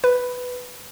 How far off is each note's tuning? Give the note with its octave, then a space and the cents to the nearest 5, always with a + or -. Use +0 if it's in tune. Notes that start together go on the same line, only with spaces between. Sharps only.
B4 +5